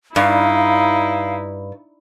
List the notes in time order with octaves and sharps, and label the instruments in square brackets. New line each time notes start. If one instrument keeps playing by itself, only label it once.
[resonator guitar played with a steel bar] G2 [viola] D#4 E4 [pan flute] F5